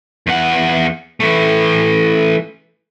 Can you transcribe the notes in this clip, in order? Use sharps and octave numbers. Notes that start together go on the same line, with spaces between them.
E2 F#5
E3 A3